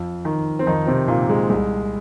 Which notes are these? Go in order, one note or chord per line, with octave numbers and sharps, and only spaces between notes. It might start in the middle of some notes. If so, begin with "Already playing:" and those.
Already playing: F2
D#3
C4
F2 D#3 D#4
C3 C4
A#2 D#3 A#3
G#3
C2 G#3